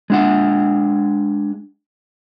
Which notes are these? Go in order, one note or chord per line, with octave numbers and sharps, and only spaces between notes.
G#3 D4 F#5